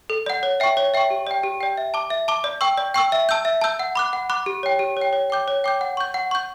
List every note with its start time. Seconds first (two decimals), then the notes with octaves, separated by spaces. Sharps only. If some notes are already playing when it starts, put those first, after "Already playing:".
0.10 A4
0.26 D5 F#5
0.43 C#5
0.60 E5 G5 C#6
0.77 C#5
0.94 E5 G5 C#6
1.10 G4
1.27 D5 G5
1.43 G4
1.61 D5 G5
1.78 E5
1.94 A5 D6
2.10 E5
2.28 A5 D6
2.44 D5
2.61 G5 C#6 E6
2.77 D5
2.94 G5 C#6 E6
3.12 E5
3.29 A5 E6 G6
3.45 E5
3.61 A5 E6 G6
3.79 F#5
3.95 B5 D6 F#6
4.13 F#5
4.30 B5 D6 F#6
4.46 G4
4.63 C#5 G5
4.79 G4
4.97 C#5 G5
5.13 C#5
5.30 G5 D6 G6
5.48 C#5
5.64 G5 D6 G6
5.81 F#5
5.97 C#6 G6
6.14 F#5
6.31 C#6 G6